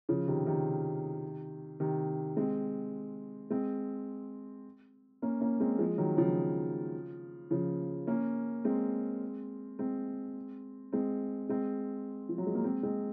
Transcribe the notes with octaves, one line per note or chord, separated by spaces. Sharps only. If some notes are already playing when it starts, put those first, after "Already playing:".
C#3 F3
C3 D#3
C3 D#3
C3 D#3
G#3 C4
G#3 C4
A#3 C#4
A#3 C#4
G#3 C4
F3 G#3
D#3 F#3
C#3 F3
C#3 F3
A#3 C#4
G#3 C4
G#3 C4
G#3 C4
G#3 C4
F3
F#3
G#3
A#3
G#3 C4
G#3 C4